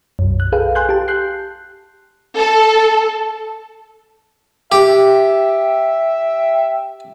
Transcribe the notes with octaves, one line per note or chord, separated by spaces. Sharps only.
B1 F#2
F#6
G#4 A4 B4 F5 G5
G#5 C6 F#6 G6
G4 A5
F#6 G6 C7
A4
G4 E5 G5